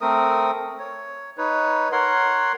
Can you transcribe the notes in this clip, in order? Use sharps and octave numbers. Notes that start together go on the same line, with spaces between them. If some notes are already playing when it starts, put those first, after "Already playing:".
A3 C4 A#4 D#6
C#5
D#4 B4 C#5
A#4 C#5 F#5 C6